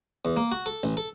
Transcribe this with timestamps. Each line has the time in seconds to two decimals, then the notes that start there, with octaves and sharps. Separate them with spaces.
0.25 E2
0.37 A#3
0.52 F#4
0.66 A4
0.83 A1
0.97 A4